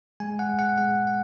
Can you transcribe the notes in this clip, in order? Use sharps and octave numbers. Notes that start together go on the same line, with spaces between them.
G#3 G#5
F#5
G#3
F#5
G#3 F#5
F#5